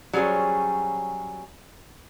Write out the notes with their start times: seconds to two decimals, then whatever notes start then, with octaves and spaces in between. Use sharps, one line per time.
0.13 F#3 G3 C#4 G#4 C5